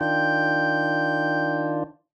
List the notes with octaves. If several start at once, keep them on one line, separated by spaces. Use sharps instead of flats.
D#3 D4 F4 G5